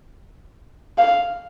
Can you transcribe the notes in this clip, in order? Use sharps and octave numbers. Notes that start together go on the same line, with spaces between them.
F5